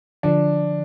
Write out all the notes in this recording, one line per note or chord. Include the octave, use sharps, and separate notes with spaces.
D3 F3 D4